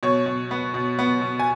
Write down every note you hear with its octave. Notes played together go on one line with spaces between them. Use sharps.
B2 C#5
B2
B3
B2
B3
B2
G#5